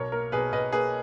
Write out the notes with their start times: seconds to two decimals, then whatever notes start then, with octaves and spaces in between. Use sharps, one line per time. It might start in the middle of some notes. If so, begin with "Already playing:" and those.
Already playing: B1 A#4 C#5
0.12 A#3 A#4
0.32 B1 G#4 B4
0.52 B1 B4 D#5
0.72 A#3 G#4 B4